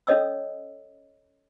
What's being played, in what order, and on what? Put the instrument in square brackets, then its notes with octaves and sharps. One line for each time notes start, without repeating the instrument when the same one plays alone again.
[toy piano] C#4 A4 C#5 D#5 D#6 E6